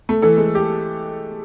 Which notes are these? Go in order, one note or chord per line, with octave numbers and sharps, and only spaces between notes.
A3
E3 A4
G#3
G4